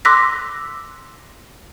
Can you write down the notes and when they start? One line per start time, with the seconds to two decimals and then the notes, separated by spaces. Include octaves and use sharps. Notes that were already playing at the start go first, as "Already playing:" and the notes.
0.05 C6 D6 E6 F#6 A#6 B6